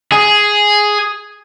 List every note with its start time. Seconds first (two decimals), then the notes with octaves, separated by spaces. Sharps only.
0.12 G#4